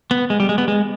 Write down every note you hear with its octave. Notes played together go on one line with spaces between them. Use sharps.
B3
G#3
G3
G#3
B3
G#3